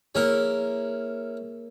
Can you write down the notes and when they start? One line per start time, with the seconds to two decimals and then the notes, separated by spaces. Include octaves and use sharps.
0.15 A#3 C#4 E4 G#4 A#4